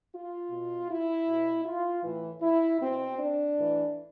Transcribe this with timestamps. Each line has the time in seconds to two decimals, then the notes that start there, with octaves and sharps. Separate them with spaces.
0.13 F4
0.51 B2
0.89 E4
1.28 B2
1.66 F4
2.03 A2 E3
2.41 E4
2.80 B2 C4
3.17 D4
3.56 A2 E3